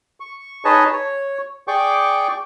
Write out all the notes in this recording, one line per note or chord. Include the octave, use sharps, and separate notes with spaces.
C#6
D#4 G#4 B4 C#5 D#5 A5
C#5
G#4 D5 G5 C#6 D6